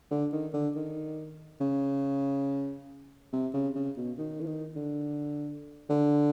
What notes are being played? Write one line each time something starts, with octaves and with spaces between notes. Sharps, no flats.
D3
D#3
D3
D#3
C#3
C3
C#3
C#3
B2
D#3
E3
D#3
D3
D3